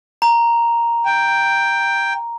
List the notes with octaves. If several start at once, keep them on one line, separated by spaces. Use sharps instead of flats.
A#5
G5